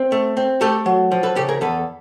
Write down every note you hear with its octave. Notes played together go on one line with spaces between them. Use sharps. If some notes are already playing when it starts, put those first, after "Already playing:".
Already playing: C4
A3
C4
A3 G4 A4
F#3
F3
A4 B4
C#3 G4 A4
G#4 A#4
E2 A4 B4